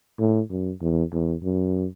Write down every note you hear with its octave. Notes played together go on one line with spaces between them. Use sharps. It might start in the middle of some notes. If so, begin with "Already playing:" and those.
A2
F#2
E2
E2
F#2